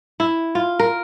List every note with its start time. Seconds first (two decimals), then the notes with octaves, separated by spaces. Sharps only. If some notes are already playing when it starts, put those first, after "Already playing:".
0.20 E4
0.55 F4
0.79 A#4